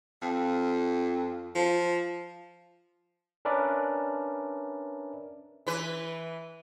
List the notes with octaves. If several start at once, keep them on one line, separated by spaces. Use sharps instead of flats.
F2
F3
C#4 D4 A#4 B4 D5 E5
E3 B4